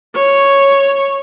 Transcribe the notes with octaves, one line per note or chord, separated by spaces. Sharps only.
C#5